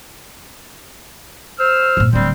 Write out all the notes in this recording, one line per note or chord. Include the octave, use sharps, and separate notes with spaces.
C5 E6 F6
G1 A#2
D1 D3 G3 C4